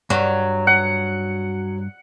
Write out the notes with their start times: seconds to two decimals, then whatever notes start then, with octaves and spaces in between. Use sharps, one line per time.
0.10 G2 F#3
0.67 F#5